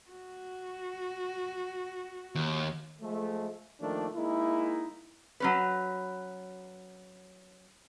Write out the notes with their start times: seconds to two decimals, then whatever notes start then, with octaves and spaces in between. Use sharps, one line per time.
0.10 F#4
2.35 D#2
3.01 F3 G#3 A3
3.81 D#3 F3 A3 A#3 D4
4.15 G#3 A#3 D#4 E4
5.40 F#3 C#4 B4